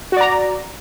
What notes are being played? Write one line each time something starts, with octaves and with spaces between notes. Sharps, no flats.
F#4 D5 A#5